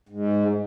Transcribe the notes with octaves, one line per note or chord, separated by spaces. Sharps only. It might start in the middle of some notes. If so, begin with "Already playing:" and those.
G#2